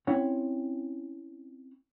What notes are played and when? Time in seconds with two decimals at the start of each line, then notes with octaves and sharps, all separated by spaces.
0.07 C4 C#4 E4 C#5 F#5